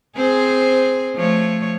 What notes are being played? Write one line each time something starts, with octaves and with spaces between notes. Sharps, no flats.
C4 G#4 C5
F3 A3 C#5